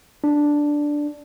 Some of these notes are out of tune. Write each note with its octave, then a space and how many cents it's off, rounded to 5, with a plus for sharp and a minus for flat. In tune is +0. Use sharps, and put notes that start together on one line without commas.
D4 +0